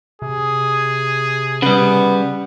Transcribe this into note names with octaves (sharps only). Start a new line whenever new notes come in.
C3 G#4
C#3 G3 B3